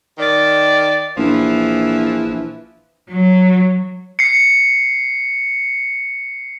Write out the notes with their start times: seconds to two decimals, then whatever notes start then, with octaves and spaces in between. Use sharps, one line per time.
0.18 D#3 D5
1.17 A#1 E3 F3 E4
3.10 F#3
4.19 C7 C#7